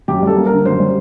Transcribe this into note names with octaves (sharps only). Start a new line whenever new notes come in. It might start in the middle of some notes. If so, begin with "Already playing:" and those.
F#2 G4
G3 A4
A#3
A#4
D3
F#2 C5
G3